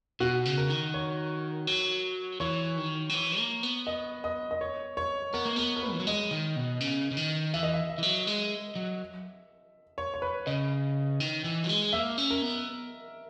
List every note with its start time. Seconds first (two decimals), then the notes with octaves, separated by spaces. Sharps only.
0.20 B2 F#4
0.45 C#3
0.58 A#4
0.70 D#3
0.94 C#5
1.67 F#3
2.40 E3 C#5
2.78 D#3
3.10 F#3
3.14 E3
3.38 A#3
3.63 B3
3.87 D#5
4.24 D#5
4.51 D#5
4.61 C#5
4.97 C#5
5.34 B3 A#4
5.46 A#3
5.56 B3 A#4
5.76 A#4
5.83 B4
5.93 E3
6.00 F#3
6.07 G#3 D#5
6.31 D#3
6.56 B2
6.81 C#3
7.11 C#3
7.17 D#3
7.54 E3 E5
7.63 D#5
7.74 E5
7.90 E5
7.98 E3
8.03 F#3
8.27 G#3
8.76 F#3
9.98 C#5
10.14 C#5
10.22 B4
10.46 C#3 D#5
11.20 D#3
11.44 E3
11.64 F#3
11.69 G#3
11.93 A#3 E5
12.18 C#4
12.30 A#4
12.42 B3